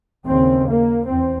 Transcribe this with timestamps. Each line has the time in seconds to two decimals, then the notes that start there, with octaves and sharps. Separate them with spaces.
0.27 D#2 C#3 C4
0.68 A#3
1.08 E2 C4